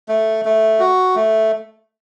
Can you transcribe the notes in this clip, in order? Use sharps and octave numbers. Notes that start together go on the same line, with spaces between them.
A3
A3
F#4
A3